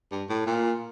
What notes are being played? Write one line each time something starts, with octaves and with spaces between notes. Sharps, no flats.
G2
A2
A#2